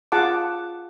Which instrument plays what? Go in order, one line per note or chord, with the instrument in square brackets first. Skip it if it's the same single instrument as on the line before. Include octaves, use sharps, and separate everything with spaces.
[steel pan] F4 G#4 F#5 A5 D6